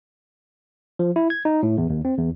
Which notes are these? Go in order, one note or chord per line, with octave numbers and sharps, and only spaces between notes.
F3
E4
G#6
D#4
A2
E2
D#2
C4
E2